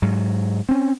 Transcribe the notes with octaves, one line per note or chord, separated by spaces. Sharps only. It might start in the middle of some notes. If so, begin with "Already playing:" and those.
G#2 F#3
C4 C#4